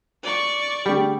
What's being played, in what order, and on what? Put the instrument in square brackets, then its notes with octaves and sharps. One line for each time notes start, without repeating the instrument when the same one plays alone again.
[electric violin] D5 C#6
[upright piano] D3 A3 G#4 [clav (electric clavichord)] G3 [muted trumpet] G4